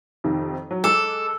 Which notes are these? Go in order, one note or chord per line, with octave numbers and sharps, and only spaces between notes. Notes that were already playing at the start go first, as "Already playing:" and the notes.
F2 C3 D#3
F#3
G#3 A4 D6